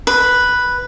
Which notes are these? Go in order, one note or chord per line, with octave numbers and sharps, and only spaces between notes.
B4